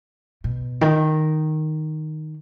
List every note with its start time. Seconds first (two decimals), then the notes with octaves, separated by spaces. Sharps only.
0.44 B2
0.81 D#3